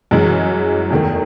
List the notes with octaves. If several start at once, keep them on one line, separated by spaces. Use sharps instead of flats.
F#2 E3 G#3
E2 D#3 A3